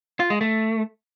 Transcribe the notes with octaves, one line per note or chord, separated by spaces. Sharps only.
F4
G#3
A3